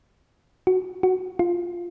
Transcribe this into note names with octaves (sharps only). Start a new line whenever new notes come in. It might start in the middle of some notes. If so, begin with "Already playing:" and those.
F#4
F#4
F4